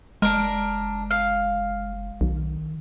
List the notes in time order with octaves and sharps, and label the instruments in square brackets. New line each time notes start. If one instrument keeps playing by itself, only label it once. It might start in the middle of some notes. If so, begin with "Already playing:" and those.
[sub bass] F#1 [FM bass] G#3 [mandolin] D4 A#4
[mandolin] F5
[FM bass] B1 [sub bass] D#3